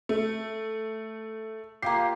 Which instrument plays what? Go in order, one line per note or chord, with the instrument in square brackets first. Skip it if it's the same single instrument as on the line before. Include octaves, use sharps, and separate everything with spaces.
[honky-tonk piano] A3
[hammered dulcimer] A#3 F4 G4 [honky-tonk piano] C7